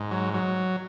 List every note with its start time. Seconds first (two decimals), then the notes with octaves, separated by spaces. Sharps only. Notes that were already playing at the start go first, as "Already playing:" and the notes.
Already playing: G#2
0.11 F#3
0.33 F#3